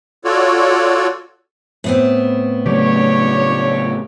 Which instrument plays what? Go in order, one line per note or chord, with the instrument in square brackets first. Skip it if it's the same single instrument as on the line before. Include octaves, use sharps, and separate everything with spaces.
[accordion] F4 F#4 A4 C#5 D5
[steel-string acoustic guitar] A2 B3 C4
[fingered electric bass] C#3 F#3 A3 [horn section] D4 G4 C#5